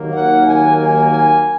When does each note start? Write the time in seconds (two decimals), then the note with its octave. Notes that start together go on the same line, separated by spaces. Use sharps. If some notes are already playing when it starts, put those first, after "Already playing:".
Already playing: D#2 D#3 F#3 A#3
0.12 F#5
0.44 G#5
0.77 G#5
1.09 G#5